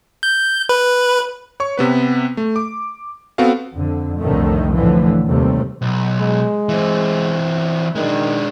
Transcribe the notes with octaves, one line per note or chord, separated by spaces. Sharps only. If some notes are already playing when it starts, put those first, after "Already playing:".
G6
B4
C#5 C#6
C3 B3 B4
A3
D6
B3 C4 F#4 A4 F5
F2 D3
C2 F2 A2 D3 D#3 A3
A2 D3 E3 F3
D#2 C3 G3 A3 C4
B1
G#3
E3 C4
D#3 G#3 D4